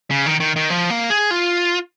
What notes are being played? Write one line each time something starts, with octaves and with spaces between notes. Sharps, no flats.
C#3
D#3
D#3
D#3
F3
A#3
G#4
F4